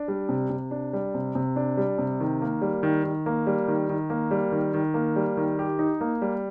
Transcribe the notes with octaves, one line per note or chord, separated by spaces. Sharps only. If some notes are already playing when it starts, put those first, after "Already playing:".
Already playing: D4
G3
C3
C3
D4
G3
C3
C3
D4
G3
C3
D#3
A#3
G3
D#3
D#3
A#3
G3
D#3
D#3
A#3
G3
D#3
D#3
A#3
G3
D#3
G4
D#4
A#3
G3